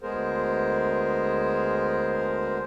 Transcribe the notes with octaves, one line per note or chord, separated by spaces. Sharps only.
D2 G#3 B3 G#4 A#4 C5